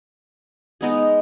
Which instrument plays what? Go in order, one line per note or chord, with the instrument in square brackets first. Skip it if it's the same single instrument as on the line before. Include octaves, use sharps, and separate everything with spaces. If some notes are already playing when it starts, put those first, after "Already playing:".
[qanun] G#3 B3 D#4 G#4